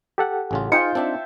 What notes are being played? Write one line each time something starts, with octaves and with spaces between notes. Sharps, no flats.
G4 A4 F#5
A1 C#3 F4
D#4 F4 G#4 C5 F5 G5 C#7
C4 D4 E5 A5